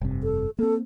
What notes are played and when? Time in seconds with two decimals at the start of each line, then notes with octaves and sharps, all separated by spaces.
0.01 F1 G2 C3
0.23 A4
0.59 A#3 C4 A4